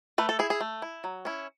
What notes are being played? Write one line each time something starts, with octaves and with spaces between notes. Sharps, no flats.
A3 B4
A4
E4 G#4
G#4
A3
E4
F#3
C#4 E4